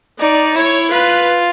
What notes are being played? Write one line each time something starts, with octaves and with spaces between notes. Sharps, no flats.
D#4 D5
E4 C#5
F4 B4